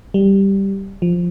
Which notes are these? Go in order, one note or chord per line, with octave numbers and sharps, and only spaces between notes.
G3
F3